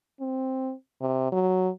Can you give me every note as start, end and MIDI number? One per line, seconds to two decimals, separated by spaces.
0.20 0.73 60
1.01 1.28 48
1.32 1.69 54